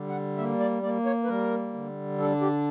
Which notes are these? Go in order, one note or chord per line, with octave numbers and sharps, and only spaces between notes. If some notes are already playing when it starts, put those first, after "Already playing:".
Already playing: D3 G3
F#5
A#3 E5
D5
A#3 D5
C#5
B4
G3 A#4
D3
D4 A4
G4